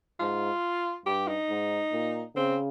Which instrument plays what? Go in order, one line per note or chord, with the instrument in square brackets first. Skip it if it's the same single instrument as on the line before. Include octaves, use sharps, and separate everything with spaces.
[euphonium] G#2 [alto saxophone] F4
[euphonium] G2 [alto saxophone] G4
[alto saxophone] D#4
[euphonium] G#2
A#2
[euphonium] C#3 [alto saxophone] C4